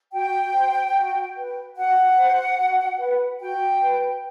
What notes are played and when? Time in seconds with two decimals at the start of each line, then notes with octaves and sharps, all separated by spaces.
0.12 F#4 G5
0.53 C5
0.95 F#4
1.35 B4
1.76 F#4 F#5
2.17 C5
2.58 F#4
2.99 B4
3.40 F#4 G5
3.81 B4